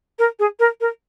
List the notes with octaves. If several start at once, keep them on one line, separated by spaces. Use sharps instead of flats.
A#4
G#4
A#4
A#4